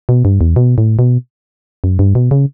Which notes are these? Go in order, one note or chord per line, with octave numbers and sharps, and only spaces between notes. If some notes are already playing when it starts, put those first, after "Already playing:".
B2
G2
E2
B2
A2
B2
F#2
G2
B2
C#3